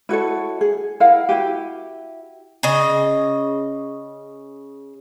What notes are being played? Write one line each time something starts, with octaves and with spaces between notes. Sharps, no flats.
E4 F#4 A4 C#5
G#4
E4 A#4 F5 F#5
E4 F#4 G4
C#3 D#5